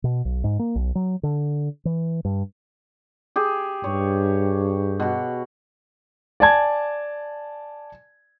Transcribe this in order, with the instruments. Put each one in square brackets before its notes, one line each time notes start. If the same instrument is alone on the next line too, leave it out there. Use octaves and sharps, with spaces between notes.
[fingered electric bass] B2
B1
G#2
A#3
B1
F#3
D3
E3
G2
[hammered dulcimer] G4 G#4
[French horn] G2 [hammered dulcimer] C#5
[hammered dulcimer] B2 F#4
[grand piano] D5 G#5 A5 G#6